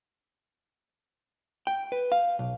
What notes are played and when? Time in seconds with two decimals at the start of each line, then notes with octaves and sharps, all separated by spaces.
1.67 G5
1.92 B4
2.12 F5
2.39 B1